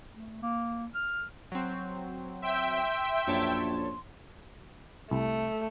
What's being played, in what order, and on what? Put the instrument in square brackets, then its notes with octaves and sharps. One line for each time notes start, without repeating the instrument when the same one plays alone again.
[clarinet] A3
A#3
F6
[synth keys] F#3 C4
[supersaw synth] E5 G5 [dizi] C6
[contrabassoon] A#1 [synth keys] F#2 C#5 A5
[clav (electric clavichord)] C2 [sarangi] A3